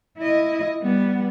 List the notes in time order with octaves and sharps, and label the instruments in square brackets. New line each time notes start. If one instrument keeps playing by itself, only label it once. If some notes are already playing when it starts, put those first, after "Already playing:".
[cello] E4 D#5
G3 B3